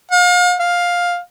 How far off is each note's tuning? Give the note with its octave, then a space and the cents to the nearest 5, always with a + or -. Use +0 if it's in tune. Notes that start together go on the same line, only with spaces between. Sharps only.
F5 +40
F5 +10